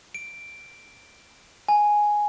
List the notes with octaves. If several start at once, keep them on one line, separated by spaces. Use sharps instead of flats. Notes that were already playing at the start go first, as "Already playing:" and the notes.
D7
G#5